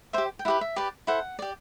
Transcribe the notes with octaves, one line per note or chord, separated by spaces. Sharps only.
G4 C5 E5 G5
G5
E4 G4 B4 F#5
E5
G4 B4 D5
E4 A4 C5 F#5
G4 D5